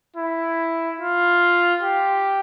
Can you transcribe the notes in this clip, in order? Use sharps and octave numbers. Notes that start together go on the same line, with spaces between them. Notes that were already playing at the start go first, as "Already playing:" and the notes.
E4
F4
G4